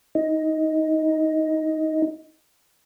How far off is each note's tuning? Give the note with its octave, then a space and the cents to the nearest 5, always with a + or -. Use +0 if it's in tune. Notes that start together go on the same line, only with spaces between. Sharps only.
D#4 +15